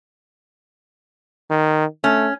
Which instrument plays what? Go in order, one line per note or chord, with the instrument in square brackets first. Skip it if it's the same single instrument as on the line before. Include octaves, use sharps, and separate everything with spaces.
[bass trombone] D#3
[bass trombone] A3 [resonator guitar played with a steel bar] C#4